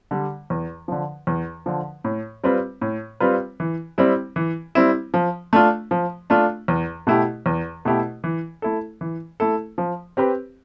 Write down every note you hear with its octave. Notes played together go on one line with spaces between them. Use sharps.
D3 G3
E2
D3 F3
E2
D3 F3
A2
G3 C4 F4 B4
A2
G3 C4 F4 B4
E3
G3 C4 E4
E3
G3 C4 E4
F3
A3 D4 F4
F3
A3 D4 F4
E2
B2 A3 E4 G4
E2
B2 A3 E4 G4
E3
A3 E4 A4
E3
A3 E4 A4
F3
C4 G4 B4